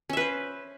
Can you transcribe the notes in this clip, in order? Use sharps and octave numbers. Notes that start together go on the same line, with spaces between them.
C#4 B4 C5 E5